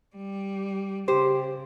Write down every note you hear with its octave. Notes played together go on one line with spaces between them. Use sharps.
G3
C#3 G4 C5